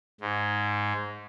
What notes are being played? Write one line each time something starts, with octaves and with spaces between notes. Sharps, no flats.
G#2